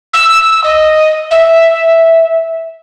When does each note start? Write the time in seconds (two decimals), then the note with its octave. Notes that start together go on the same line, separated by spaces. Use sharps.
0.13 E6
0.64 D#5
1.31 E5